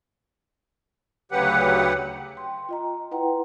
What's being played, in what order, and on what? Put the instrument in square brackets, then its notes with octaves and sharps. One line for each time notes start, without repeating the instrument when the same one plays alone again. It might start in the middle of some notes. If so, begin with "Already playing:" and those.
[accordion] D2 C#3 F#3 G4 B4 F#5
[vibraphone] G5 C6
F4 D#5 A#5
E4 B4 F#5 G5 A#5 C6